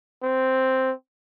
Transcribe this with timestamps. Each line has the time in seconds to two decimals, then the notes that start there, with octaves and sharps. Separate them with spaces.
0.23 C4